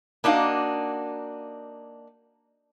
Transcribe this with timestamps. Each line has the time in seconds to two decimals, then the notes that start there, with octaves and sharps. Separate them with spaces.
0.24 A#3 D4 D#4 F#4 F5